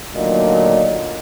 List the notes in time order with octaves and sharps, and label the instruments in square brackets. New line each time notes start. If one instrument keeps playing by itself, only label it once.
[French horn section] D2 A#2 D#3 F#3 D4 D#5